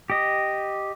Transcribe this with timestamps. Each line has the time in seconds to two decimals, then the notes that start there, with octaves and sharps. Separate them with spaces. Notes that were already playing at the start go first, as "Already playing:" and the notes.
0.10 G4 D#5